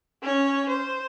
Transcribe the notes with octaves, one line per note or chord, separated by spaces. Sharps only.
C#4 C#5
C5